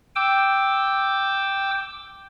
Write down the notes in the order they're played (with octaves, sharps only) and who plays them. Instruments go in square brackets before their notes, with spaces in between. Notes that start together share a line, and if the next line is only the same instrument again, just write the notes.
[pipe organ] G5 D6 E6